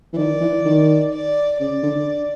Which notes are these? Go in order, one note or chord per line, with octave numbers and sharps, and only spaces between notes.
E3
D#3 D5
E3
D#3
D5
C#3 D5
D3